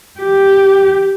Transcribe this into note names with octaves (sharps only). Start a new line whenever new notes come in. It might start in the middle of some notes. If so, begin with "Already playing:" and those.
G4